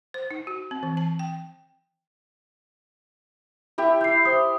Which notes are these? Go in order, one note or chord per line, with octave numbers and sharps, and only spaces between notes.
C5
D#4
F#4
C4
E3
A5
G5
E4 G4 E5
E4 G6 C7
C5 C6 D#6